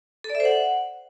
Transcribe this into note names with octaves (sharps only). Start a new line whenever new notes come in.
A4
D5
E5
C5
F#5